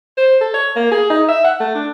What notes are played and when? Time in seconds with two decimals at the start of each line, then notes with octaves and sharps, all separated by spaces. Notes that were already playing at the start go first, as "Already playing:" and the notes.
0.17 C5
0.41 A4
0.54 C#5
0.76 A#3
0.92 G#4
1.10 D#4
1.29 E5
1.44 F#5
1.60 A3
1.75 D4